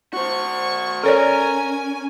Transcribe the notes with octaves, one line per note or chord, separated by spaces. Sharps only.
F#4 C5 C#6
C#4 A4 A#4 C#5 D5 G#5